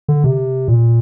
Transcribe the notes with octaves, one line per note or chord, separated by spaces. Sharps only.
D3
C3
A#2